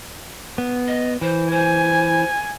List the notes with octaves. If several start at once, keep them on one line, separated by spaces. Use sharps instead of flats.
B3
D#5
E3 C5
C5 G#5